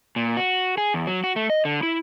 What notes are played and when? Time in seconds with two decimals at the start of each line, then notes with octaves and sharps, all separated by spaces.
0.16 A#2
0.37 F#4
0.78 G#4
0.94 E2
1.07 F#3
1.24 F#4
1.36 A3
1.50 D#5
1.65 D3
1.83 E4